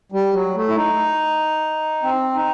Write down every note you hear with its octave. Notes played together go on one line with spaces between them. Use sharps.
G3
F#3
A3
E4
D#4
C4
D#4